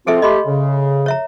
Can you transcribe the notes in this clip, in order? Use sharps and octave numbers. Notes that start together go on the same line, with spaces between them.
F3 C4 F4 G#4 A4 E5
A3 G4 D#5 B5 C6
C#3
C#5 E5 A#5